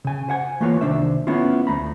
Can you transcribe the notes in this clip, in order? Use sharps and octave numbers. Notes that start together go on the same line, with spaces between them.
C#3 G#5
C5 F#5 G#5
E3 A3 A#3 F4 B4 C#5
C2 D#3 D4 C5 E5
A3 B3 C#4 E4 F4
D2 A3 A#5 B5